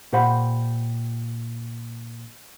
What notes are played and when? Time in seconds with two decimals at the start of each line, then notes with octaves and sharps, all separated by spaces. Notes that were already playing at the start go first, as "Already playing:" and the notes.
0.13 A#2 G4 C5 F#5 B5